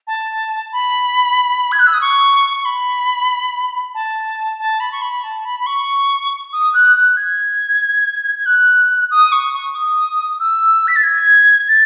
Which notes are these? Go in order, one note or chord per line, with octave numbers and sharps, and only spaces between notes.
A5
B5
G#6
F#6
E6
D#6
C#6
C#6
B5
A5
A5
B5
C#6
B5
A5
B5
B5
C#6
D#6
F#6
F#6
G#6
G#6
F#6
D#6
C#6
C#6
D#6
E6
B6
A6
G#6
A6